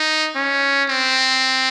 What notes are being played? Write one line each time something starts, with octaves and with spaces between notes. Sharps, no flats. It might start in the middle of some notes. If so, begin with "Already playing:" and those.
Already playing: D#4
C#4
C4